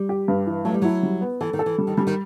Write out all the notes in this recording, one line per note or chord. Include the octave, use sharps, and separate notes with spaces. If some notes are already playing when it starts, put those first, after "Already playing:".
Already playing: G3
G4
G2
E3
F#3 A3
G3
F#3 E4
G3
B3
E3 A4
D#3
A4
E3
G3
D#3
E3 G3
D#3